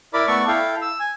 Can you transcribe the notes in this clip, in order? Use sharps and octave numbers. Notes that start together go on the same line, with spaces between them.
E4 A#4 D5 B5 D6
A3 B3 A4 D5 C#6
E4 A4 F5 G5
E6
G#5